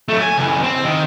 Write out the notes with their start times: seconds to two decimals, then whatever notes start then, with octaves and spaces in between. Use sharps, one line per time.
0.09 F#3 A3
0.20 G#5
0.38 C#2 E3
0.63 C4
0.84 D#3